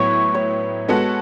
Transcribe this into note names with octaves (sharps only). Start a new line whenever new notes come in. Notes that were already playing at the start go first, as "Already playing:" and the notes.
Already playing: A2 F#3 B3 E4 C#5
C#5
G#3 B3 F#4 A4